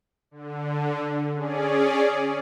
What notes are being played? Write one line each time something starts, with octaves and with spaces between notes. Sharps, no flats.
D3
C#4 G#4 D5